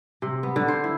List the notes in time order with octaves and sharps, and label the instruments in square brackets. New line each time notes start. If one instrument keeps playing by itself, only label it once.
[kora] C3
B3
D3
C5
E4